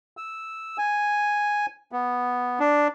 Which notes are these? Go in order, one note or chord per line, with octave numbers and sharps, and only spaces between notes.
E6
G#5
B3
D4